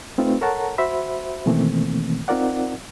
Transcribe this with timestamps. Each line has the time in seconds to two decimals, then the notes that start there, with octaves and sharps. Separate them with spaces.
0.18 A3 C4 D#4 F4 B4
0.41 A4 A#4 C#5 F#5 A5 A#5
0.78 F#4 C5 E5 B5
1.46 B2 D#3 E3 A3 A#3 C4
2.28 C4 D#4 F4 A#4 D5 F#5